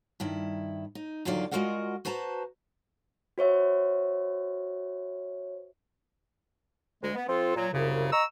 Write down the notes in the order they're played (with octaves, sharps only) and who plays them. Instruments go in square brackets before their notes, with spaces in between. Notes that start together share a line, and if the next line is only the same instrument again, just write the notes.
[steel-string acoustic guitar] G2 D#3 E4
D#4
E2 D3 D#3 F#3 F4 D5
G#3 F4 F#4 A#4 D#5 F#5
F#4 B4 C5 A5 A#5
[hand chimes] F#4 C5 C#5 E5
[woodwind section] D2 G#3
B3
F3 C4 F4 A4
A#2 F#3
C2 F#2 C#3
D#5 A#5 C#6 E6